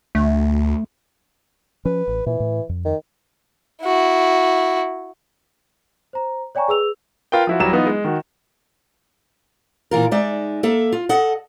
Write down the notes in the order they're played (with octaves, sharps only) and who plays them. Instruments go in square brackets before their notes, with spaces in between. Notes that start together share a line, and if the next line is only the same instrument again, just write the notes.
[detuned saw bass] D2 [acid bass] A3
[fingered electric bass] F3 C#4 [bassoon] B4
[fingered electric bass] A1
[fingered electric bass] A#2 [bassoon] E3
[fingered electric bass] A2
F2
[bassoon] D#3
[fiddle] E4 F#4
[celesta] C5 A#5
C#5 D5 G5 G#5 A#5 C#6
G#4 B4 E6 F7
[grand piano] F4 A#4 B4 G5
F3 E4 F#4
D1 F#3 G3 E4 A#5 E7
E3 B3 D#4 F4
G#3
D#3 F#4
[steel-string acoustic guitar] A#2 E3 F4 A#4
G#3 D#4 D5 E5
A#3 A4 E5
F4
A4 D#5 F#5